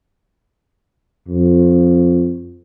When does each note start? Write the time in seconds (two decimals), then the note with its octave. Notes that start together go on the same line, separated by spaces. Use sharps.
1.28 F2